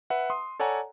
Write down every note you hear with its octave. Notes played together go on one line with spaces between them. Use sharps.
B4 E5 F#5
C6 D#6
A4 C#5 D5 F#5 G#5 A#5